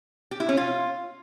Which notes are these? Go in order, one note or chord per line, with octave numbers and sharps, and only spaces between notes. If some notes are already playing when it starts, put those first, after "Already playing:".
G4
E4
C#4
F4